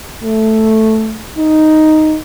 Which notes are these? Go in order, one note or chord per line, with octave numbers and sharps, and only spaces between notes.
A3
D#4